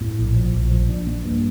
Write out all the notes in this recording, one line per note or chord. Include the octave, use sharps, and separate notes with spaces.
A2
A#1
F3
A#1
F3
D4
A#3
G2